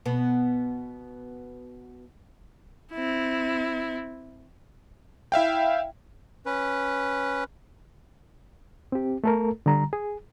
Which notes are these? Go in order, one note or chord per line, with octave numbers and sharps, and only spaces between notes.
B2 B3
C4 E4
E4 E5 F5 G5
C#4 B4
C4 G4
A3 A4 A#4
D3 G3 A#5
G#4